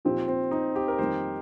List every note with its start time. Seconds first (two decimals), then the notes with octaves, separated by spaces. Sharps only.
0.05 A#2 F3 C4 D#4 G4
0.28 C4
0.51 D#4
0.76 G4
0.88 A#4
0.99 F2 D#3 G3 A#3 C5